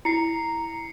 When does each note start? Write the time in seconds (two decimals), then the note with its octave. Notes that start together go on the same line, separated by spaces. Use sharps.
0.05 E4 A#5 C7 C#7